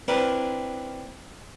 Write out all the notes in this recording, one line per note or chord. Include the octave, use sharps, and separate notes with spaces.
C4 D4 E4 A#4 B4